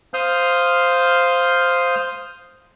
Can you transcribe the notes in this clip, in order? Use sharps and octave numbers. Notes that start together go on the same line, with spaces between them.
C5 F5 D#6 F6 G6